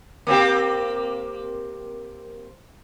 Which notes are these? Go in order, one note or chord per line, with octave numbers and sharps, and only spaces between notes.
A#3 C4 G4